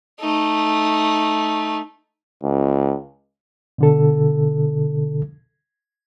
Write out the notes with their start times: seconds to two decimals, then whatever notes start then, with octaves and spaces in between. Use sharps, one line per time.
0.20 A3 D#4
2.43 C#2
3.78 B2 D3 A4